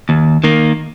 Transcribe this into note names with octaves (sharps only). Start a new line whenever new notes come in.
D#2
D#3 A#3